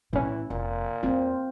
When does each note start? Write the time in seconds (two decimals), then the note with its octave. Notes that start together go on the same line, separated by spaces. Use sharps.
0.13 B1 A2 E3 C#4
0.50 F1 A#2
1.03 E2 A3 C4 F4